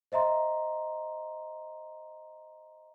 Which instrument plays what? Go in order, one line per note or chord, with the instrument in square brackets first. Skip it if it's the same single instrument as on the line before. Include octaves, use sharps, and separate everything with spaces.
[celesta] C5 D#5 E5 A#5 C6